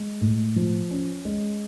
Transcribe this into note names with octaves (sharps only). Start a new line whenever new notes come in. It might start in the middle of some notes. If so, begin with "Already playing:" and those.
Already playing: G#3
A2
F3
C#4
G#3